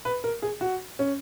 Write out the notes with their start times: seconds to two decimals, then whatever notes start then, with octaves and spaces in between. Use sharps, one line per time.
0.05 B4
0.24 A#4
0.42 G#4
0.61 F#4
0.99 C#4